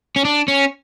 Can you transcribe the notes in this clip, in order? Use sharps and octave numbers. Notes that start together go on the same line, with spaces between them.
C#4
D4
C#4